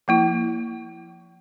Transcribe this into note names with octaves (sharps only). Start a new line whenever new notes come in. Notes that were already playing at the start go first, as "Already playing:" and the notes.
F3 A#3 E4